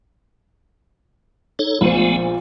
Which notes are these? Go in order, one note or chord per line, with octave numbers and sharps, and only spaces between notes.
D#4 A4 C#5
A#1 A#2 G#3 A3 B3 C5